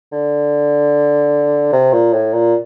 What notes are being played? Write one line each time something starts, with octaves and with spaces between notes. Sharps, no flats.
D3
C3
A#2
A2
A#2